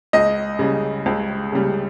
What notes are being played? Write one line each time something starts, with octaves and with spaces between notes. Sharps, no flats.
C#2 D#5
C#3 G3
C#2
C#3 G3